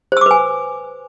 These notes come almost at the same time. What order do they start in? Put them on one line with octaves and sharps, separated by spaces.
C5 E6 D6 B4 G#5